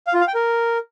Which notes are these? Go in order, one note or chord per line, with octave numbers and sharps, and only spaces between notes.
F5
F4
F5
G5
A#4